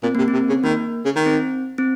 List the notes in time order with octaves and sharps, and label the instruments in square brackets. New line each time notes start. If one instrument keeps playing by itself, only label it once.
[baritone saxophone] A#2 [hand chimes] C4
[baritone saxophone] C3 [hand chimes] A#3
[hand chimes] C4
[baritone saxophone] C3
C#3
[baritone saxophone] D#3 [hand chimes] A#3
[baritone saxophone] C#3
D#3
[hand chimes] C4
C4